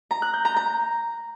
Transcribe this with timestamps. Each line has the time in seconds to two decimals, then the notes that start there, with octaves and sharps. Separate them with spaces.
0.11 A#5
0.22 F#6
0.34 G6
0.45 A#5
0.56 A#5